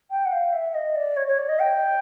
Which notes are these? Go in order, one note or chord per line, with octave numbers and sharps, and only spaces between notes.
G5
F#5
F5
E5
D#5
D5
C#5
C#5
D5
D#5
G5